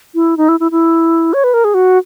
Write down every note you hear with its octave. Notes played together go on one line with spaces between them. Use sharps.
E4
D#4
E4
E4
E4
C#5
B4
A#4
G#4
F#4